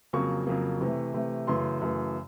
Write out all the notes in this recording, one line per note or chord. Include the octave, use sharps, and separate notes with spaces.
F2 C#3 F#3 A#3 C#6
F2 C#3 F#3 A#3
C3 E3 A3
C3 E3 A3
F#2 C#3 E3 A3 C6
F#2 C#3 E3 A3